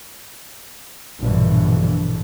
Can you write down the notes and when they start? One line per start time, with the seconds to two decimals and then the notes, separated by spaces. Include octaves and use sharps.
1.21 A#1 G2 B2 D3 E3